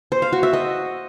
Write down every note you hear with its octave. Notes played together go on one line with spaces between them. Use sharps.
C5
F5
F#4
E5
D#5